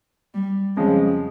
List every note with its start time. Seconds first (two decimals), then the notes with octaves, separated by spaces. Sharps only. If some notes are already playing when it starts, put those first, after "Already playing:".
0.34 G3
0.76 F2 C#3 F3 G#3